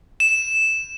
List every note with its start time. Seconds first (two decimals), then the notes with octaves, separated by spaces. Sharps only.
0.20 E7